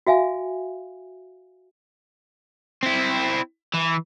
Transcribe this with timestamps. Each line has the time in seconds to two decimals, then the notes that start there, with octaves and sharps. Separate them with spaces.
0.07 F#4 E5 F5 G#5
2.83 C4 E4
3.74 E3